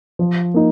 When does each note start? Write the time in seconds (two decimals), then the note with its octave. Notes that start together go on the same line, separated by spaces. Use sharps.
0.19 F3
0.54 A#3 D#4